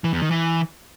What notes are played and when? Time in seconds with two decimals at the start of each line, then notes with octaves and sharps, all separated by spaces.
0.04 E3
0.13 E2
0.22 D#3
0.31 E3